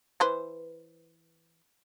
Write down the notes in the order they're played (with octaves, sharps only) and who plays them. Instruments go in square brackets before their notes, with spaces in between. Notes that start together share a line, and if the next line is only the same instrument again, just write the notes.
[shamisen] E3 B4 C5